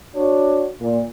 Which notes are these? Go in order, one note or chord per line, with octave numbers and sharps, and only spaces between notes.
D4 F#4 C#5
A#2